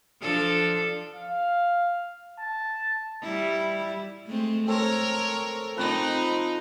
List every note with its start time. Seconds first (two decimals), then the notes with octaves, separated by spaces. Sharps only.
0.22 F3 D4 A4
1.16 F5
2.40 A5
3.23 G3 E4
4.26 G#3 A3 C4
4.67 C4 A4 A#4 C#5
5.77 F3 C4 D#4 B4 G5